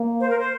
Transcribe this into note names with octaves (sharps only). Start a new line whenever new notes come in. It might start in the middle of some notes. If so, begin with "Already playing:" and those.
Already playing: A#3
C5
A#4
C5